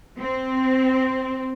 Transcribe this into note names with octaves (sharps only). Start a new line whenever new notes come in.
C4